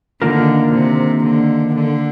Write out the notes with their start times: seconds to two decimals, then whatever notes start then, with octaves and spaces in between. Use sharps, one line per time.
0.22 D3 D#3 A#3 D4 F4 A#4
0.73 C3
1.25 D3
1.76 D3